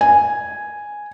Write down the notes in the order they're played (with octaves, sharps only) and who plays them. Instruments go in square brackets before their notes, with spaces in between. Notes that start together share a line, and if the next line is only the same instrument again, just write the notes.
[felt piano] G#5